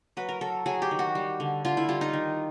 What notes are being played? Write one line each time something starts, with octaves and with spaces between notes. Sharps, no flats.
F#3 B4
A#4
F#3 A4
F#3 G#4
G4
D#3
F#4
G3
D3
D3 F4
E4
G3 F4
D#4
D#3